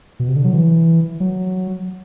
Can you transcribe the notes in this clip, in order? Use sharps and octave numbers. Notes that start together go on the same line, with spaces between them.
B2
C3
D3
F#3
E3
F#3